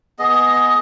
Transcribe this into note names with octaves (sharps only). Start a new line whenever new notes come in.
B3 G#4 D#5